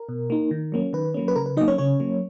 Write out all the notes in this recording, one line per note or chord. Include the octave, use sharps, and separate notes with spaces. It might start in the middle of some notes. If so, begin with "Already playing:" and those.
Already playing: A#4
B2
A#3 D#4
D#3
F#3 A#3 C#4
D#3 B4
F#3 A#3 C#4
B4
C#3 A#4
B4
F#3 A#3 D#4 D#5
C#4 C#5
C#3 C#4 C#5
F#3 A#3